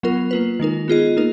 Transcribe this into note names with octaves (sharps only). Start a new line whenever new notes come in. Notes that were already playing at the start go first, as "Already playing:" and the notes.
F#3 B3 F4 A#4
A#3 F4 B4
D#3 G#3 D#4 A#4
B3 F4 G#4 D#5
A#3 D#4 A#4